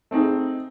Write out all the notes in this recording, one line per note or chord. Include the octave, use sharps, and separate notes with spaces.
A3 C4 D#4 G#4